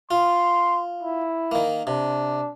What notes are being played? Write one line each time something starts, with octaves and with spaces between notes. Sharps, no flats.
F4 C6
E4
D#3 A#3
C3 D4